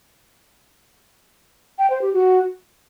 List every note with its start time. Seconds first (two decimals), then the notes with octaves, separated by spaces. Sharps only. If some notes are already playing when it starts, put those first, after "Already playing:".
1.79 G5
1.90 C5
2.02 G4
2.13 F#4